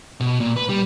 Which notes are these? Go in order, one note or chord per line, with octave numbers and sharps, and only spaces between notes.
B2
A#2
B4
G3